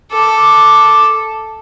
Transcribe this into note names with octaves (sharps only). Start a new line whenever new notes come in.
A4 D6